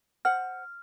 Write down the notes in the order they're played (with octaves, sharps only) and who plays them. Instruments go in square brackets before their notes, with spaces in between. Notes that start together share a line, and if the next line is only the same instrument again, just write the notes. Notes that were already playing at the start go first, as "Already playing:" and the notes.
[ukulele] C5 F#5 [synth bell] F6